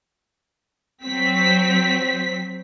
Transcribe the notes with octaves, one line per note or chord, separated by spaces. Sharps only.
F#3 C4 B6